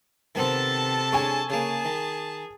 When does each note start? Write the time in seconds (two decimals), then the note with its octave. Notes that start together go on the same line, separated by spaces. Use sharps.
0.35 C3 D#3 B3 C4 A4 A5
1.12 G#3 D4 C#5 G#5 C#6
1.50 C#3 A#3 G#4 A5
1.85 D#3